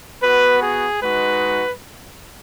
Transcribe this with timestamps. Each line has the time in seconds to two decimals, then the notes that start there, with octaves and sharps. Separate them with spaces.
0.23 B3 F#4 B4
0.62 G#4
1.01 G#3 D#4 F#4 B4